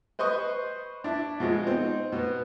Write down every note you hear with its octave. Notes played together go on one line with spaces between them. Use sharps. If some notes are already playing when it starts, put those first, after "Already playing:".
B4 C5 D#5 C6 C#6
D4 E4
B2 F3 G#3
C4 D#4
B2 B3